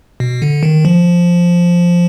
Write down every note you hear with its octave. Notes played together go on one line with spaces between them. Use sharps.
B2
D3
D#3
F3